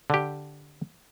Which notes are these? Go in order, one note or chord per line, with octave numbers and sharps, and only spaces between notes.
D3 G4